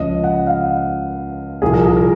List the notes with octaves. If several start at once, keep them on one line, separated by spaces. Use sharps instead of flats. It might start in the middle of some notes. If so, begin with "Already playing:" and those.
Already playing: C#2 C#3 F3 D#5
F#5
F5
C2 A#2 F3 G#4
A#4
G#4
A#4